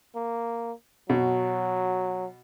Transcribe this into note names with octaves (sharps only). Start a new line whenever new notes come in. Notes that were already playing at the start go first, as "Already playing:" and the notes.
A#3
B2 F#3